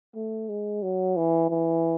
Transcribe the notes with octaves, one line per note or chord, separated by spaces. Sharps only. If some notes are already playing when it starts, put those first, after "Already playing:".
A3
G#3
F#3
E3
E3